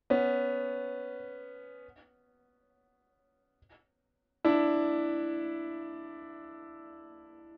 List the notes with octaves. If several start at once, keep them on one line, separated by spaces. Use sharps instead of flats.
B3 C#4
D4 E4